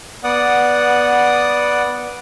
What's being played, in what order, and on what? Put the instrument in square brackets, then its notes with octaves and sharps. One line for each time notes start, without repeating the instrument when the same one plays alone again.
[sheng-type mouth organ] B3 D5 F#5 D#6